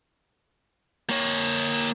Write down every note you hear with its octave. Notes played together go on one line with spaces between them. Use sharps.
A#3 C#5